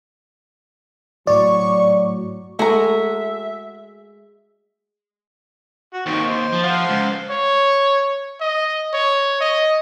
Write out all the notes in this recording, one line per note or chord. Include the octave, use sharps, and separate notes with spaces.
A2 F#3 D5 C#6
G#3 A3 F#4 E5 A#5
F#4
D#2 D#3 C4 C#6
C5
F3
C5 F5 F#5
C#2
C#5
D#5
C#5
D#5